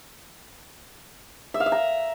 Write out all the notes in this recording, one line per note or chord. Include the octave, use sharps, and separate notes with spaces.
E5
F5
E5
A#5